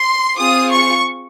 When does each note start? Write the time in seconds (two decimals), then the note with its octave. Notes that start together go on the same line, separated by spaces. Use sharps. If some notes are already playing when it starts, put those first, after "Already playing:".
Already playing: C6
0.37 C4 F4 G#4 D#6
0.70 C#6